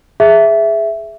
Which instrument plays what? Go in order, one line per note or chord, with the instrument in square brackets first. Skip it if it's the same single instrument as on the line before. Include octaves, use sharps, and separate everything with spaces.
[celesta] G#4 E5